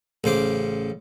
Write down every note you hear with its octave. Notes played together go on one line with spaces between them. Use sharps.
A1 C#3 C5 D6